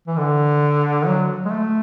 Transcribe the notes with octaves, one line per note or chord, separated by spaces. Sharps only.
E3
D3
F#3
G#3
A3